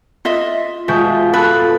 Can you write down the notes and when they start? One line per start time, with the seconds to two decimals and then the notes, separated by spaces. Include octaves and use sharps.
0.25 F4 D#5 E5
0.88 B2 G#3 F4 E5 G6
1.33 A4 B4 B5